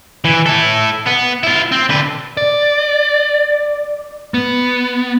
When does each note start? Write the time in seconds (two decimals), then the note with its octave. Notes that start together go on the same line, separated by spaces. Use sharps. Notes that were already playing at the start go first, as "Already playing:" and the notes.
0.25 E3
0.46 E4 A4
1.07 B3
1.43 E4 F4
1.72 C4
1.90 D3 B4
2.37 D5
4.34 B3